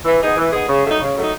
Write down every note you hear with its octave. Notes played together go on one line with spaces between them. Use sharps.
E3
B3 D#4 G#4
E3
B3 D#4 G#4
C#3
F#3 A3 D#4
C#3
F#3 A3 D#4